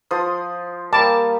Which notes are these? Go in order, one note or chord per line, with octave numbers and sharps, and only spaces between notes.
F3 C6 D#6
G3 A#3 A5 D6